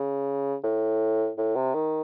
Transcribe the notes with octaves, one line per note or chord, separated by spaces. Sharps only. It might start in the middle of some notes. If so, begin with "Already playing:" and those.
Already playing: C#3
A2
A2
C3
D#3